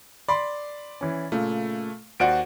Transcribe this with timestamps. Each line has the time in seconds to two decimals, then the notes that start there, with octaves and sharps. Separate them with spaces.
0.28 D5 B5 C6 D6
1.01 E3 C#4
1.32 A#2 C#3 A3
2.20 D#2 F#4 C5 D5 F#5 D7